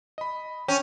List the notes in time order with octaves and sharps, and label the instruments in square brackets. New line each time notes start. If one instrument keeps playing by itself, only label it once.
[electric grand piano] D#5 B5
[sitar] C#4 [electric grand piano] G5 C#6